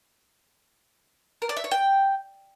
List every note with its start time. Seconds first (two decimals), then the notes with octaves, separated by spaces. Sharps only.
1.42 A#4
1.49 D5
1.57 E5
1.64 C#5
1.71 G5